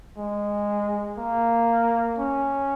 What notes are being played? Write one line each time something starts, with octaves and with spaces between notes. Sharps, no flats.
G#3
A#3
C#4